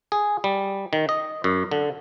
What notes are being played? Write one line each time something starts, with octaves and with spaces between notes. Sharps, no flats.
G#4
G3
D#3
D#5
F#2
D3